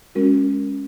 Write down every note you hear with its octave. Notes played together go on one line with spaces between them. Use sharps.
G#3 C#4 F#4 A#4